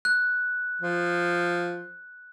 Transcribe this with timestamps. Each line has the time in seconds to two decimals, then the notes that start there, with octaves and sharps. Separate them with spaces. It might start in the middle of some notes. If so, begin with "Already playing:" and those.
0.05 F#6
0.81 F3